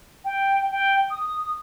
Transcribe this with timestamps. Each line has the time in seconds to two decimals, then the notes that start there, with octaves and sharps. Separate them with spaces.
0.25 G5
0.71 G5
1.10 D#6